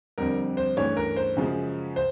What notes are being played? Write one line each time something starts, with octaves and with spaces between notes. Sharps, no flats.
F2 D3 G3 C4 A#4
C5
G2 E3 A3 C#4 C#5
A#4
C5
F#2 C#3 F3 G#3
C5